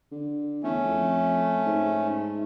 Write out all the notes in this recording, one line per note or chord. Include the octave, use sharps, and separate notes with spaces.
D3
E2 A3 C#4
F2
G#2